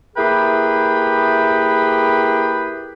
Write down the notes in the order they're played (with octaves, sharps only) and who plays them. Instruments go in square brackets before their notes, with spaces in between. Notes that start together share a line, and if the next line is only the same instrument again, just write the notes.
[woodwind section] A#3 E4 G4 G#4 B4 G5